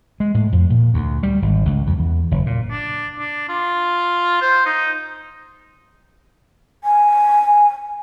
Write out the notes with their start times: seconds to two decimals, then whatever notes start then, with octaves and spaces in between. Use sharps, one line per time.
0.20 G#3
0.34 A2
0.52 F2
0.70 A#2
0.94 D2
1.23 G3
1.42 G#1
1.65 C#2
1.87 F2
1.99 E2
2.31 F#1
2.46 A#2
2.70 D4
3.19 D4
3.49 F4
4.41 C5
4.66 D#4
6.84 G#5